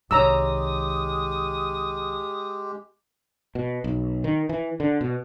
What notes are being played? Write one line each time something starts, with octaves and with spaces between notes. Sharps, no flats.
C2 D#3 G#3 G4 C#5 A#5 D#6 E6
B2
B1
D#3
E3
D3
B2